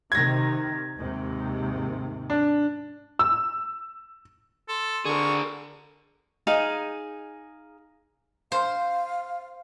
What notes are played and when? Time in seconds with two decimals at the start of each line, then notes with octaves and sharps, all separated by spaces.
0.12 C3 D#3 G#6 A#6
0.97 D#2 G#2 C3
2.30 D4
3.19 E6
4.69 A4 C6
5.05 D3 G#4 A#4 C#6
6.47 D#4 G#4 F5
8.52 C5 F5